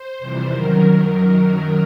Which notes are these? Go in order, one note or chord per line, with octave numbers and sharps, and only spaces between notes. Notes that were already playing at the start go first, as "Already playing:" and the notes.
Already playing: C5
F2 C3 E3 G3
F#2 D#3 F#3 A#4